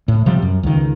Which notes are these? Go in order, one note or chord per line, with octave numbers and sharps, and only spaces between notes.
A2
C3 F3 G3
F#2
C#2 D#3